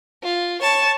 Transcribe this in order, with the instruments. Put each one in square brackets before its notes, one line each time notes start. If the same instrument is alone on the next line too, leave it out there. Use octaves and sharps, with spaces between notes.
[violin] F4
[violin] C#5 [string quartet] A5